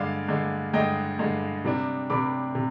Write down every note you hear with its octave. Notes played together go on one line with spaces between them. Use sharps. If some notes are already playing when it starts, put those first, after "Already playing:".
Already playing: G2 D3 G#3 D5 F5
G2 D3 G#3
G2 D3 G#3 D#5 G5
G2 D3 G#3
C3 G3 D4
C3 G3 D4 B5 D6
C3